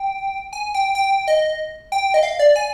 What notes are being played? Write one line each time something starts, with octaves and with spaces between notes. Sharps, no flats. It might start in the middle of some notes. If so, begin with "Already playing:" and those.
Already playing: G5
G#5
G5
G5
D#5
G5
D#5
F5
D5
G#5